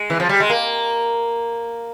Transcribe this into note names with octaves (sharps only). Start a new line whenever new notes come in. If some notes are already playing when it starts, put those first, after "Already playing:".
Already playing: G#3
E3
F3
G3
G#3
A#3